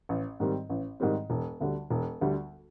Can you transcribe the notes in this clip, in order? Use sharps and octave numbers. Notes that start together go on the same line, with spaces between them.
A1
G#2 D#3 G3 C4
A1
G#2 D#3 G3 C4
E1
D2 D3 G3
E1
D2 D3 G3